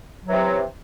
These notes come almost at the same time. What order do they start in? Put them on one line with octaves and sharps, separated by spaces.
F#3 E3 C3